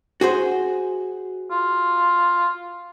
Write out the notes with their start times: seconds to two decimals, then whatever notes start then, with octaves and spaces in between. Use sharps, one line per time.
0.21 F#4 G#4 C5
1.51 F4